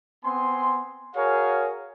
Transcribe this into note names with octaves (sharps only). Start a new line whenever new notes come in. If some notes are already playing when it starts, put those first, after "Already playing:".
B3 C4 G#5 C6
F#4 G#4 A#4 C#5 F5 G#5